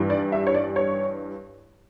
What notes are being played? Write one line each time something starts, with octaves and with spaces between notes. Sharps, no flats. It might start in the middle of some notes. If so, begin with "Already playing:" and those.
Already playing: G2 E3 G3
D5
E5
C#5
D5
C#5